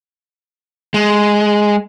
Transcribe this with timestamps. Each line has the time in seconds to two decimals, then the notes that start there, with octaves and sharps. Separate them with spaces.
0.94 G#3